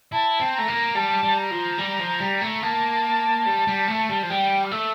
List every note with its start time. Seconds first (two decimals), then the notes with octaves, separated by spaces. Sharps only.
0.12 E4 A5
0.40 C4
0.54 A3 A#5
0.68 A#3
0.95 G3 A5
1.23 G3
1.37 A#5
1.51 F3
1.79 G3
2.00 F3
2.21 G3
2.42 A3
2.63 A#3 A5
3.46 G3
3.67 G3
3.88 A3
4.09 G3
4.23 F3
4.30 G3 G5
4.64 F6
4.71 A3 E6